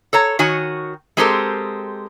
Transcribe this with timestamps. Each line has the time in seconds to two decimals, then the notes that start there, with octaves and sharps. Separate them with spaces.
0.13 A4 C#5 A#5
0.39 D#3 F#4 C#5 G#5
1.17 G#3 C4 G4 A4 A#4 C5